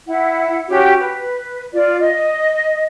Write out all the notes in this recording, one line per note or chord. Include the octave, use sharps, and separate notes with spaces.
E4 F#5
C#4 F#4 G4
B4
F4 D5
D#5